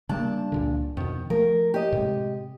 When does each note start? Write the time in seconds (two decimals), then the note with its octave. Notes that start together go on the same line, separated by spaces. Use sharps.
0.09 G2 C#3 G3 A#3 D4 A5
0.52 C#2 A#2 D3
0.97 F2 B2 D#3
1.30 F3 A3 A#4
1.74 G4 D#5
1.92 A2 C3 G#3